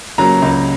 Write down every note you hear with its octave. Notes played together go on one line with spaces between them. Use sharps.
C#3 F#3 A#3 A#5
C#2